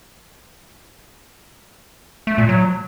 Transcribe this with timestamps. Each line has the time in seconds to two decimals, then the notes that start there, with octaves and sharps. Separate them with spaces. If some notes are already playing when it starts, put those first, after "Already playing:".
2.27 A3
2.38 A#2
2.49 F#3